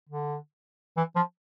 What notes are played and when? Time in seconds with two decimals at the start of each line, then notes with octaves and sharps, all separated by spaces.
0.09 D3
0.97 E3
1.16 F3